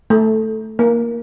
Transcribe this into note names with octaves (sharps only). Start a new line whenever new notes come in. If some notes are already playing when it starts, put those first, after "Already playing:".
A3
A#3